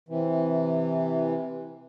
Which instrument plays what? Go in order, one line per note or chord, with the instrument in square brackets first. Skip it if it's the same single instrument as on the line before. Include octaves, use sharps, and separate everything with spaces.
[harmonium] C3 E3